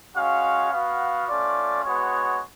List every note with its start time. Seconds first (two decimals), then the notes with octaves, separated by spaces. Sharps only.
0.16 G#3 C#4 F#4 F5
0.72 B3 F#4 F5
1.28 A3 C#4 F4 D5
1.83 G#3 B3 F#4 C#5